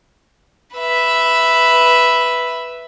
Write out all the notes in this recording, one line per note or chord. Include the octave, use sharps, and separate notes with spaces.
B4 E5